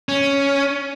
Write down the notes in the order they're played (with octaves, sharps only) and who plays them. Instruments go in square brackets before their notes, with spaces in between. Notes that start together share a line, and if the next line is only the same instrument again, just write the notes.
[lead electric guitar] C#4